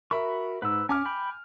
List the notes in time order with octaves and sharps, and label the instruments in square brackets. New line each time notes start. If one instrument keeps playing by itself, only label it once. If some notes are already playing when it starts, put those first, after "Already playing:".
[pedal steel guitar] F#4 B5 C#6 [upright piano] A#4 E5
[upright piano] G#2 [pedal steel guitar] B4 E6
[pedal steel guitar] C#4 [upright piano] G#5 D6 F6
[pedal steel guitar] G5 B5